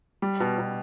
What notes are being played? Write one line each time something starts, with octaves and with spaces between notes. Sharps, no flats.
G3
B2
B2